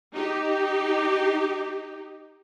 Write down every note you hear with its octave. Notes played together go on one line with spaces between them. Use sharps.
D#4 G4